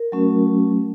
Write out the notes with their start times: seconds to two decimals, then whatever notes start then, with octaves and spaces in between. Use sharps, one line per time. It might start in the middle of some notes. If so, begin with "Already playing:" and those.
Already playing: A#4
0.12 F#3 A3 C#4 F#4